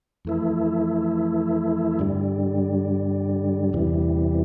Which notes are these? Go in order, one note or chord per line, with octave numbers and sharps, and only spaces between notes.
F2 E3 A3 E4
G2 D3 G3
E2 C3 E3 G3